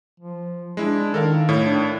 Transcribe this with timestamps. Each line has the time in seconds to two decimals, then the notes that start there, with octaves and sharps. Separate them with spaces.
0.20 F3
0.77 G#3 D4 E4
1.14 D#3 A4 A#4 F5
1.49 A2 E4 C#5
1.64 D4